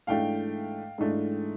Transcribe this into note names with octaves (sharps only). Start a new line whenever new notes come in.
G#2 E3 A3 D4 F5 G5
G#2 E3 A3 D4